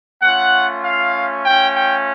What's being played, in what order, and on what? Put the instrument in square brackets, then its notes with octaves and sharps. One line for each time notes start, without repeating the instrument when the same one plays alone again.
[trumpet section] A3 C#4 F4 F#5
F5
A3 C#4 F4 G5
G5